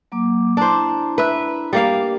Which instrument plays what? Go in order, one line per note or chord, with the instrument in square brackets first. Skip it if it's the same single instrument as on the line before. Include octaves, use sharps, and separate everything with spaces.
[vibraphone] F#3 A#3 D6
[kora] D4 C5 [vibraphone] E4 A#5
[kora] B4 E5
G3 A#3 F5